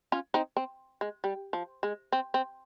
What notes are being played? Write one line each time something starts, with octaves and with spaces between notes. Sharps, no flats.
C#4 F4
C4 D#4
C4
G#3
G3
F3
G#3
C4
C4